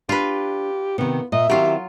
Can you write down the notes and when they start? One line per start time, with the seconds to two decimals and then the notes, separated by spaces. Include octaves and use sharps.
0.09 D4 F4 G4 B4
0.98 C3 D#3 B3
1.32 A#2 D#5 E5
1.50 D#3 F#3 C4 E4 F4 G4